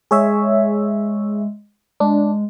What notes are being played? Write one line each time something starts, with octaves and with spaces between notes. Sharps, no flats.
G#3 G#4 C#5 E5
G#3 D4